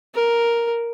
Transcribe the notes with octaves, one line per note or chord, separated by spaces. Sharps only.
A#4